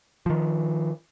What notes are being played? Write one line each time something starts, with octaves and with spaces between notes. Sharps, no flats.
D#3 F3